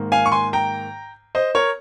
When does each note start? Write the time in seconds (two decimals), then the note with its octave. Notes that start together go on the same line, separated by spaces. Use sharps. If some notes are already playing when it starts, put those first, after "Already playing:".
Already playing: G#2 D#3 A#3
0.12 F5 G#5
0.26 C#6
0.32 G#5 C6
0.53 G5 A#5
1.35 C5 D#5
1.55 A#4 C#5